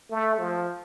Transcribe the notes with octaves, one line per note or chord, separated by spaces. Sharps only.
A3
F3